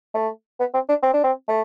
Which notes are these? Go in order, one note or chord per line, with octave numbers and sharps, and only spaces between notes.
A3
B3
C4
D4
C4
D4
C4
A3